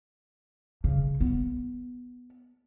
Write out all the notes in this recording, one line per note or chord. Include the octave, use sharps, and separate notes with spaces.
C#3
B3